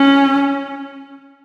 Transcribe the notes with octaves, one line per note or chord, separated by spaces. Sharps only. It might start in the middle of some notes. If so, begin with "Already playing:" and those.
Already playing: C#4